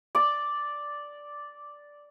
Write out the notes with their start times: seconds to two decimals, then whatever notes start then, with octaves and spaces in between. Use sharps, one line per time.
0.15 D5 D6